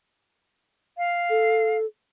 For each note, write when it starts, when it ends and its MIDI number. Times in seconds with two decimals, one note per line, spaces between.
0.97 1.77 77
1.30 1.85 69